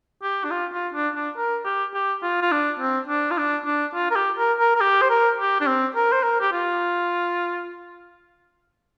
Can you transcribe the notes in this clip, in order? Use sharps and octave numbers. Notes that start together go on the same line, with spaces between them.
G4
D4
F4
F4
D4
D4
A#4
G4
G4
F4
F4
D4
C4
D4
F4
D4
D4
F4
A#4
G4
A#4
A#4
A#4
G4
C5
A#4
G4
D4
C4
A#4
C5
A#4
G4
F4